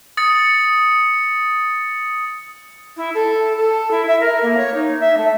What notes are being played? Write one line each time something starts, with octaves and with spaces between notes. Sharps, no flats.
D#6 A6 C#7
E4
A4
A4
E4
E5
A#4
A#3
C#5
D#4
E5
A3